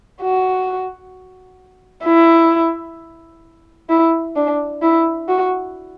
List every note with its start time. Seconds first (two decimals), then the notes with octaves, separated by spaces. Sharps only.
0.22 F#4
2.05 E4
3.89 E4
4.36 D4
4.82 E4
5.29 F#4